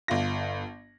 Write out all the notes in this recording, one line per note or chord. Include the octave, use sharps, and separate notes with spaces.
G1 F4 A#6